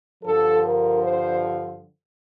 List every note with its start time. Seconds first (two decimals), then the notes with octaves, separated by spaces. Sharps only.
0.24 G2 D3 F3 A4
0.64 A#4
1.03 C5